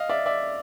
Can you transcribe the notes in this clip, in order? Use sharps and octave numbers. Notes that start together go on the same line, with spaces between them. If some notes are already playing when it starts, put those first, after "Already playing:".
Already playing: D#5 F5
D5 E5
D5 E5